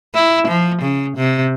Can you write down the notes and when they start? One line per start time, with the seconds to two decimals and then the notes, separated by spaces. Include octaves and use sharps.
0.15 E4
0.48 F3
0.82 C#3
1.17 C3